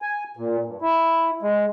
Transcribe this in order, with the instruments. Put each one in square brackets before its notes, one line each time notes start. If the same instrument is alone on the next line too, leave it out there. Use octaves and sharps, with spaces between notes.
[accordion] G#5
A#2
G2
E4
G#3